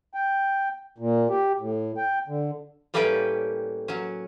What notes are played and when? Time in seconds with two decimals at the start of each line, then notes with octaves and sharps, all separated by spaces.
0.14 G5
0.98 A#2
1.30 G4
1.60 A2
1.97 G5
2.28 D3
2.94 A2 G3 A#3 C#4 B4 G5
3.88 F#3 C#4